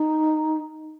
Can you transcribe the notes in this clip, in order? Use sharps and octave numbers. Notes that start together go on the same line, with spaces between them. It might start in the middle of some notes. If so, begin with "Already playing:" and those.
Already playing: D#4